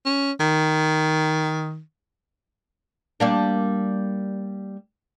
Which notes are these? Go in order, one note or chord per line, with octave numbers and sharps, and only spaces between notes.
C#4
D#3
G3 A#3 D4